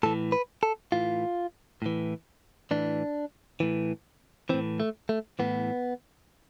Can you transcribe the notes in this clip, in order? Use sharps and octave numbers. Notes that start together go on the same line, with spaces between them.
A2 E3 A4
B4
A4
A2 E3 F4
A2 E3
A2 E3 D4
A2 E3
A2 E3 C4
A3
A3
A2 E3 B3